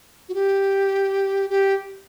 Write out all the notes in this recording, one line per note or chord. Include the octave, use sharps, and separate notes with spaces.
F#4
G4
G4